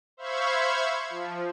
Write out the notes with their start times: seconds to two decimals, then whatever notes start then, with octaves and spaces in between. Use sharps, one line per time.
0.17 C5 E5 F5 B5 C#6 G#6
1.10 F3